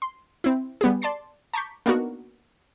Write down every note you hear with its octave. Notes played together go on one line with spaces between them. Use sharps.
C6
C4 E4
G3 B3 G4 G#4
D5 A5 C6 A6 C7
A5 A#5 C#6 D6 G6 B6
A#3 B3 D4 D#4 F#4 A#4